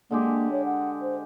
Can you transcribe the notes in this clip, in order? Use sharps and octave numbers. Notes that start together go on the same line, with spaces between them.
D3 G#3 A#3 G4
C#5
F#5
C5